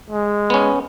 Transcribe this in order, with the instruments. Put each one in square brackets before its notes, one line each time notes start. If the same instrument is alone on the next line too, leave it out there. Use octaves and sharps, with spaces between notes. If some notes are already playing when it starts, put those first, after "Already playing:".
[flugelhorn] G#3
[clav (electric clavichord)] B3 C#4